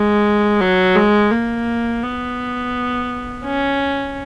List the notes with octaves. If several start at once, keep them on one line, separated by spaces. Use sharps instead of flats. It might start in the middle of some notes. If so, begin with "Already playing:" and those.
Already playing: G#3
F#3
G#3
A#3
B3
C#4